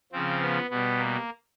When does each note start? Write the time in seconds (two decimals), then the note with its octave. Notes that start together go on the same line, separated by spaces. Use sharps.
0.12 C#3 F3 C4
0.41 B3
0.70 B2 G3 B3
0.99 A#3